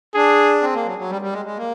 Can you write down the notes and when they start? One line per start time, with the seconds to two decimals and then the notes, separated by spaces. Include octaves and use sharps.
0.15 D4 G#4
0.62 C4
0.74 A#3
0.86 F#3
0.98 F#3
1.10 G3
1.22 G3
1.33 G#3
1.45 G#3
1.57 A#3